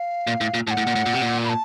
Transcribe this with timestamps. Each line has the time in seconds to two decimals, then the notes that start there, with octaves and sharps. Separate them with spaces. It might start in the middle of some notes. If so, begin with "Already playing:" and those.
Already playing: F5
0.27 A#2
0.41 A2
0.54 A#2
0.67 A2 A5
0.70 F#5
0.77 A2
0.87 A#2
0.96 A2
1.06 A#2
1.13 C3
1.22 A#2
1.45 B5
1.49 A5